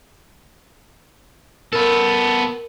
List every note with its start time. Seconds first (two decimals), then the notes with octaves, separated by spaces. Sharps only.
1.73 B3 A4 A#4